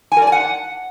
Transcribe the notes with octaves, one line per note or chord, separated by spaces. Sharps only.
G#5
A#4
D5
G#5
F#5